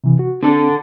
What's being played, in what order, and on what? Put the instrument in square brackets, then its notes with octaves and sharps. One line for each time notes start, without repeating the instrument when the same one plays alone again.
[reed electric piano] C3 E3
F#4
[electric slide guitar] D3 A4 [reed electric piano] C4 D4